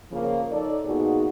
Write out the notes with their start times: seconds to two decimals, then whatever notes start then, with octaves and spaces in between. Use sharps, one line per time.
0.12 C#3 F3 A#3
0.51 D#4 A4 C#5 D5
0.85 A#2 B3 D#4 F4 F#4 G#4